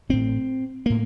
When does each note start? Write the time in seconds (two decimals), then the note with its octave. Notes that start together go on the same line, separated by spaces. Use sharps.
0.09 A1 A2 C4
0.86 A2 A#3